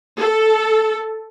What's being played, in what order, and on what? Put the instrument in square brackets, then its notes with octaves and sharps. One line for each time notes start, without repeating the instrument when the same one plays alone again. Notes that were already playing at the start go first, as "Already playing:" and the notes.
[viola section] A4